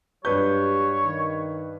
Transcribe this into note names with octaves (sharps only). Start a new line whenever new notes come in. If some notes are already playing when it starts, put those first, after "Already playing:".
G2 F#3 G4 B4 C#5 G6
D#3